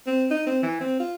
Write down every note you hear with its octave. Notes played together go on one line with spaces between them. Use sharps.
C4
D#4
C4
E3
C4
F4